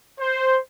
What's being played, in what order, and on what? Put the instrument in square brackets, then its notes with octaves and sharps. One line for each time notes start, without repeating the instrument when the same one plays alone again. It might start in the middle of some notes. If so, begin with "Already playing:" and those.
[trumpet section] C5